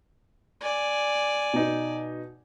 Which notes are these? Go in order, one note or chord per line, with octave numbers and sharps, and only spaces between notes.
D5 G#5
B2 D#4